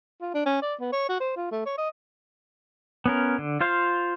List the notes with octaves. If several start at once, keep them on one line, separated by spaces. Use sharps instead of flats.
F4
D4
C#4
D5
B3
C#5
F#4
C5
F4
A3
C#5
D#5
B3 C#4 A#4
D3
F4 C5 F5